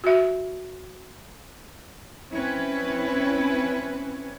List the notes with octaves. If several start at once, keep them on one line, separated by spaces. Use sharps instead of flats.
F#4 E5
C4 C#4 E4 B4 C#5